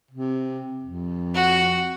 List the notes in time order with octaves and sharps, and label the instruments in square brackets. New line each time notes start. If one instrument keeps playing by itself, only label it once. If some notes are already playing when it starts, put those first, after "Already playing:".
[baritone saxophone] C3
F2
[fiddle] F#4